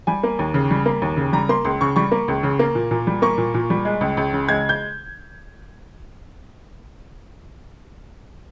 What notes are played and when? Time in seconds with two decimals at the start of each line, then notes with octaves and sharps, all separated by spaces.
0.07 G3 G#5
0.23 A#3
0.39 D#2
0.54 C#3
0.71 G3
0.86 A#3
1.02 D#2
1.17 C#3
1.33 G3 A#5
1.49 A#3 C6
1.65 C#2 C6
1.81 C#3 C#6
1.96 G3 C#6
2.12 A#3
2.28 C#2
2.43 C#3
2.59 A#3
2.75 A#2
2.91 A#2
3.07 G3
3.22 A#3 C#6
3.38 A#2
3.54 A#2
3.70 G3
3.85 G#3
4.01 C#2
4.17 C#2
4.33 C#3
4.48 G#3 G#6
4.69 G6